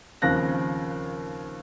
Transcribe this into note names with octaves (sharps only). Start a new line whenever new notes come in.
D#2 C#3 F3 C4 F#6 A#6